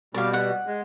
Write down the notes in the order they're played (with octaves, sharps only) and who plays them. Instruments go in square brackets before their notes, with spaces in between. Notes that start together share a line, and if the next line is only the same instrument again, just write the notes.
[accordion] B2 G3 [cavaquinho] D5 F5
[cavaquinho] F#5
[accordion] G#3